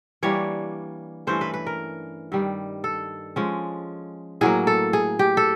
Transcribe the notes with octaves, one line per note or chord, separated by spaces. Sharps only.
E3 G3 A#3 D4 C#5
G2 E3 A3 C#4 C5
B4
B4
A#4
G2 D#3 G3
A4
F3 G#3 C#4
A2 F#3 A#3 G#4
A4
G#4
G4
A4